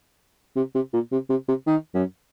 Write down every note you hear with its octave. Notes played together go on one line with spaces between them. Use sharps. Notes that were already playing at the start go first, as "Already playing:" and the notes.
C3
C3
A#2
C3
C3
C3
D#3
F#2